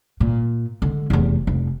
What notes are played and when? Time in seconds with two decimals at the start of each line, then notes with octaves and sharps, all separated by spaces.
0.20 A#2
0.82 D3 G#3
1.10 F1 E2
1.47 F1